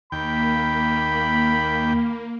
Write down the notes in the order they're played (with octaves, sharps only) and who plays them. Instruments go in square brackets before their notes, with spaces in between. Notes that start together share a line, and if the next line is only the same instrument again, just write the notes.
[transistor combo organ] D#2 G5 [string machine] A#3 [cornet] B5